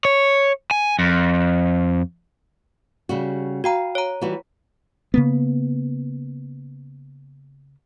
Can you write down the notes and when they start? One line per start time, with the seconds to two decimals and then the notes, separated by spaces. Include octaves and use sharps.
0.05 C#5
0.71 G#5
0.99 F2
3.09 C#3 G3 F#4
3.64 F#4 F5 G5 A#5
3.95 C#5 A#5
4.21 E3 G3 F#4
5.14 C#3 A#3 B3